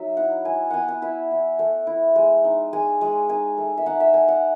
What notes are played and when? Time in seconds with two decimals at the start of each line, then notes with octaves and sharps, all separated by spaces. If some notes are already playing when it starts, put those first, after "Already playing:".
Already playing: F#3 D#4 E5
0.17 E4 F#5
0.45 E4 G#5
0.70 B3 F#5 G#5
0.88 F#5
1.02 E4 E5
1.31 E4
1.59 A3
1.87 E4
2.16 G#3
2.44 D#4
2.73 G#3 G#5
3.01 G#3
3.29 D#4 G#5
3.58 A3
3.77 E5
3.86 D#4 F#5
4.00 E5
4.14 A3 G#5
4.28 F#5